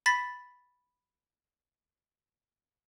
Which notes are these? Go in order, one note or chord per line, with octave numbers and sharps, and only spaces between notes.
B5 A6 B6